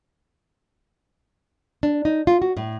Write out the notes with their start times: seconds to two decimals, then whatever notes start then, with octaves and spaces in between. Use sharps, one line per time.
1.83 D4
2.05 D#4
2.27 F4
2.42 F#4
2.57 A2